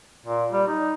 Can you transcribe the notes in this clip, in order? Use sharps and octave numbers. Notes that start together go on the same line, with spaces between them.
A#2
G3
D#4